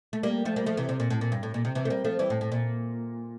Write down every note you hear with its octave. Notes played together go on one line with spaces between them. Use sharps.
A3
G3 A#3
F3 A3
G3 A#3
F3 A3
C3 E3
C3
A#2
A2
A#2
G2
A2
A#2
C3
C3 E3
A3
G3 A#3
F3 A3
E3 G3
A2
A2
A#2